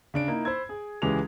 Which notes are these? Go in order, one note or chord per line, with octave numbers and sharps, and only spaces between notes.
C#3 D4 D7
A#3 D#4 E4
C5 B5 E6 G#6
G#4
C#2 E3 G#3 C#4 G4 F7